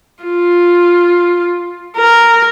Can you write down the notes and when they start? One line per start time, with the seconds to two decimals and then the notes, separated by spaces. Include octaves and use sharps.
0.23 F4
1.97 A#4